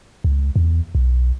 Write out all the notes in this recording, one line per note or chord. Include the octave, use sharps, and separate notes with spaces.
C#2
E2
B1